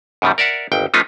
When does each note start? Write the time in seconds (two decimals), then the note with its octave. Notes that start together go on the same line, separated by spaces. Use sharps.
0.22 F#2 B2 D#3 G3
0.38 A#4 D5 E5 F#5
0.72 G1 D#2 G5
0.94 F3 A3 B3 C#4 D#4 F4